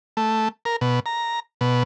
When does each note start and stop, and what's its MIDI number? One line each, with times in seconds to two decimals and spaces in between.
0.17 0.48 57
0.65 0.76 70
0.81 1.00 47
1.06 1.40 82
1.61 1.83 47